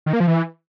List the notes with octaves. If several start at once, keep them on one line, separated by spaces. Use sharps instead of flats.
D#3
A#3
F3
E3